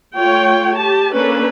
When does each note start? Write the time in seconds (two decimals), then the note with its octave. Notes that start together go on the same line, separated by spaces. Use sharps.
0.16 A3 F4 C#5 G5
0.76 G4 A5
1.16 A#3 C#4 D4 A4 B4